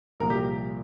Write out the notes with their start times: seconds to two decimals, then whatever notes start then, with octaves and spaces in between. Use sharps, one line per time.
0.20 C2 A#2 F3 A#4
0.30 G4